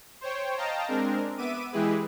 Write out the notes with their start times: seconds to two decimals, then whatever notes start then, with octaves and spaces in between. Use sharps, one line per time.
0.21 C5 C#5 G5
0.57 D#5 F5 G5 A5 A#5
0.88 G#3 C4 D4 A#4
1.37 B3 E5 D6 D#7
1.72 E3 G#3 E4 G4 G#4 B4